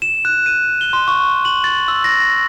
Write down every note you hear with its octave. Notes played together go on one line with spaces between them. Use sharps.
E7
F#6
D#7
G7
C6
C#6
F#7
A6
E6
A#6